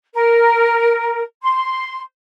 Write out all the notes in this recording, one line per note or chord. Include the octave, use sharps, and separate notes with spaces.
A#4
C6